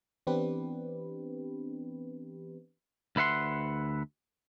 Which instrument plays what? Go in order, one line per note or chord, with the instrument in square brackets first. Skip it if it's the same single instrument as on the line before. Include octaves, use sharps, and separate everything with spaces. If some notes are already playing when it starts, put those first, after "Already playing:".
[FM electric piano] E3 B3 C4 D4 G4 B4
[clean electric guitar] D2 B4 E5 F#5 C6